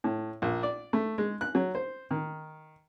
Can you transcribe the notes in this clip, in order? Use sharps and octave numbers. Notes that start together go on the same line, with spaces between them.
A2
A#1
D5
A3
G#3
F#6
F#3
C5
D#3